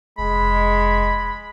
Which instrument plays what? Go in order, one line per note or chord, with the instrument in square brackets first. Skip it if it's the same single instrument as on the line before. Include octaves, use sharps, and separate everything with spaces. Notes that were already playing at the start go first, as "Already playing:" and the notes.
[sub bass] F1 [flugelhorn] G#3 [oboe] B5